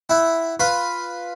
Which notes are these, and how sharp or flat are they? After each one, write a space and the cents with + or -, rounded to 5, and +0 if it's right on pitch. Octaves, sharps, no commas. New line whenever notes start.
E4 +0 F#5 +25
F4 +0 B4 +0